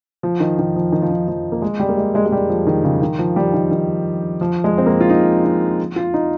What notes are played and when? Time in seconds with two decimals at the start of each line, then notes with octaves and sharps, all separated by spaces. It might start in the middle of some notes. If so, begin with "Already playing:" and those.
0.23 F3
0.40 D#3
0.59 D#3
0.76 F3
0.92 D#3
1.02 F3
1.10 D#3
1.28 F3
1.52 A#3
1.62 G#3
1.80 G3
1.89 A#3
1.97 G#3
2.15 G#3
2.26 G#3
2.32 G3
2.49 F3
2.67 D#3
2.84 C#3
3.02 D#3
3.19 F3
3.36 G3
3.54 D#3
3.71 D#3
4.41 F3
4.64 G#3
4.78 C4
4.86 A#3
5.01 F4
5.10 D#4
5.44 D#4
5.96 F4
6.14 D#4